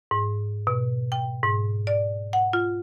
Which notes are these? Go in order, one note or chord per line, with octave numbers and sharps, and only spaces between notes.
G#2
B2
G5
G#2
D5
F#5
F4